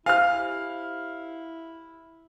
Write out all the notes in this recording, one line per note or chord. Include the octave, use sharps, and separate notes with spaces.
E4 G4 C5 F5 G#5 F6